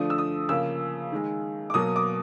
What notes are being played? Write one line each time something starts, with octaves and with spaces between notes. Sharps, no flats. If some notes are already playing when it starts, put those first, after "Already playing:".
Already playing: D3 F3 A3 D#6
E6
D#6
C#3 F3 A#3 E6
D#3 G#3
D6
B2 F#3 A#3 D#6
D6